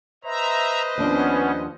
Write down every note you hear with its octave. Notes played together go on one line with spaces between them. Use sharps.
B4 C5 D#5 E5 A#5
D#2 F3 B3 C#4 D4